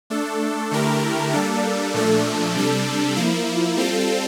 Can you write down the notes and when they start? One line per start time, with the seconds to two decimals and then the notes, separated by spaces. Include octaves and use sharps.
0.10 A3 D4 A4
0.71 D3 A3 E4 G4 A#4
1.32 G3 A#3 D4 A4
1.94 A#2 F3 A3 D4 A4
2.55 C3 G3 D4 A4
3.16 F3 A#3 E4
3.76 G3 C4 F4 A4